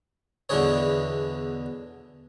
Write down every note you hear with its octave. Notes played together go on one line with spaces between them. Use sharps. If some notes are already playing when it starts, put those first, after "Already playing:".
E2 B2 D3 D4 G#4 C#5